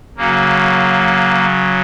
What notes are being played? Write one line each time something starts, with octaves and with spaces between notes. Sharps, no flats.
C#3 F#3 A#3